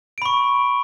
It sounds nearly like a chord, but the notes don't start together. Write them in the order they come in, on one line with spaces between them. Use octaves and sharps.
D7 B5 C#6